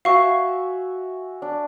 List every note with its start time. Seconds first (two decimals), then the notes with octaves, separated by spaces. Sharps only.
0.05 F#4 E5 F5 G#5 C#6
1.42 D4